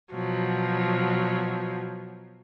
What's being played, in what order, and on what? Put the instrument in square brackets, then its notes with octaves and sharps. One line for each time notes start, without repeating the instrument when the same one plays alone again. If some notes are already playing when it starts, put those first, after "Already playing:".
[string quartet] B2 F3 F#3